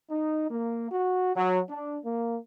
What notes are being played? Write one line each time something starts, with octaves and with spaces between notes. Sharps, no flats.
D#4
A#3
F#4
F#3
D4
A#3